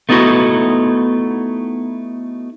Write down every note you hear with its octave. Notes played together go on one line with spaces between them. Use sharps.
A3 B3 D#4 E4 F#4